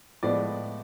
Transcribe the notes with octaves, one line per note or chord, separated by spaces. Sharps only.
A2 F3 G#3 B3 D5